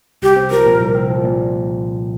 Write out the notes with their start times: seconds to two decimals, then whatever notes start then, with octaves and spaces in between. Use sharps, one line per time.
0.22 C2 G4
0.36 C4
0.51 F3 A#4
0.66 A#2
0.81 C2
0.95 C4
1.10 F3
1.24 A#2